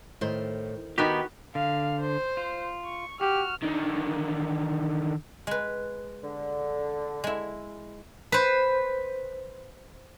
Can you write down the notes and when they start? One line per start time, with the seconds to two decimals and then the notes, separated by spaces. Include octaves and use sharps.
0.21 A2 D#3 C5
0.98 D#3 B3 D#4 F#4 G4 A#4 B4
1.55 D3 F5
2.00 C5
2.37 F4
2.85 C#6
3.21 F#4 G4 F6
3.63 D3 D#3
5.47 G#3 B4
6.23 D3
7.24 G#3 E4
8.32 B4 C5